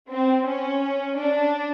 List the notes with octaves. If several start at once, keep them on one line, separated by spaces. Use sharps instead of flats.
C4
C#4
D4